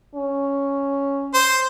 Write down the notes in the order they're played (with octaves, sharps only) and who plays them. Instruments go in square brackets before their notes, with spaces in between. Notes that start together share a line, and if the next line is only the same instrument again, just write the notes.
[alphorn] C#4
[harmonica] C5